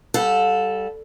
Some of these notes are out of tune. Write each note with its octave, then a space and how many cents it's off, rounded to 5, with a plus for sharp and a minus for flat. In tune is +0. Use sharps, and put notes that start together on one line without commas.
G3 -5 A4 +0 F5 +45